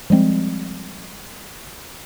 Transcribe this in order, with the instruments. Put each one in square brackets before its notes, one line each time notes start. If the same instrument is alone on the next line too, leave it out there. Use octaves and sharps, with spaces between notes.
[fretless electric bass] F3 G3 G#3 C4